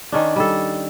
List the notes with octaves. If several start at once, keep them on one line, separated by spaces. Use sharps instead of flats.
D#3 C#4 D4
G3 A4